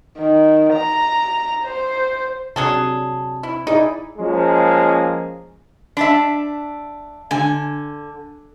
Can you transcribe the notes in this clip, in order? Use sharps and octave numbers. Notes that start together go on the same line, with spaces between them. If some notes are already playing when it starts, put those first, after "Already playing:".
D#3
A#5
C5
C3 F#3 D4 G#4 A4
E4
D#4 E4 G#4 D5
F3 G#3 A#3 C#4
D4 E5 A5 B5
D3 G#5